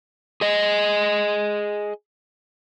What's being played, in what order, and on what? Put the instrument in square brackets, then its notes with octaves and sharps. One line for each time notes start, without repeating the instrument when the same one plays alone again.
[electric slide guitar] G#4 D#5